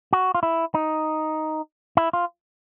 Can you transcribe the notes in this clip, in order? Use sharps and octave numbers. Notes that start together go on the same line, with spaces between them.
F#4
F4
E4
D#4
E4
F4